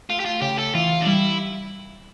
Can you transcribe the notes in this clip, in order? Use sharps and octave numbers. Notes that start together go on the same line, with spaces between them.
A3 F4
G4
F4
C#3 G4
A4
E3 F4
D4
G3 E4